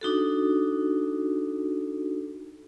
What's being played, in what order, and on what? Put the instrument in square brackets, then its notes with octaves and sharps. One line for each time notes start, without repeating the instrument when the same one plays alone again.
[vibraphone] D4 D#4 F#4 A4